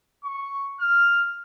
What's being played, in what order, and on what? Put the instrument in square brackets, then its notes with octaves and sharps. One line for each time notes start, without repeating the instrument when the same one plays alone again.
[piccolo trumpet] C#6
F6